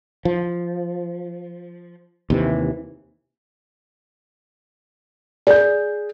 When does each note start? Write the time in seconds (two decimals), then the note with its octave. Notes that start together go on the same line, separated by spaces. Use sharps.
0.25 F3
2.30 D#2 C3 E3
5.47 G#4 D5 G6